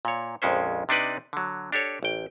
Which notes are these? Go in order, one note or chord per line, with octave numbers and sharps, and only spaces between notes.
A#2 C#5
A#1 F2 G#3 C#4 C5
C3 D4 D#4 B4 D5
D3 F#3
D4 G4 A4 C#5
A1 G5